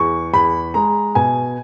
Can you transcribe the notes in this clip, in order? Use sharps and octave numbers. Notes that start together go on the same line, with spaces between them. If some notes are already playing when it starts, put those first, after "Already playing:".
Already playing: E2 C#6
E2 B5
G#3 A#5
B2 G#5